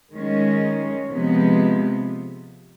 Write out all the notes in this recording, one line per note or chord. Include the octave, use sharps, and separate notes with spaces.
D#3 G#3 C#4
C3 F3 G#3 B3